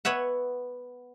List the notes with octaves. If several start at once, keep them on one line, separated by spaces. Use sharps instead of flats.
B3 C#5 E5 F#5